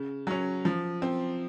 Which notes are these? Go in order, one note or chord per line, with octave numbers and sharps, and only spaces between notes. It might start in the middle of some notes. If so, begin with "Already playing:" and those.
Already playing: C#3
F#3 C#4
F3
C4